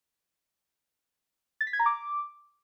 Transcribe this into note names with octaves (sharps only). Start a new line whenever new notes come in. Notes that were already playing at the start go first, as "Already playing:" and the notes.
A6
B6
G#6
A#5
D6